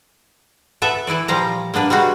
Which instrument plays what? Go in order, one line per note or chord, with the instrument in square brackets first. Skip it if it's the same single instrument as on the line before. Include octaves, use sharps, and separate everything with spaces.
[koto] B3 A4 B4 E5
E3 E4 B4 D5
A#2 F3 G3 F5 A#5
A#3 B3 D4 B4
G3 G#3 B3 F#4